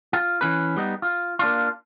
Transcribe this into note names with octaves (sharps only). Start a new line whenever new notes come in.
F4
E3 C#4 B4
G3 B3 D#4
F4
A#3 D4 F4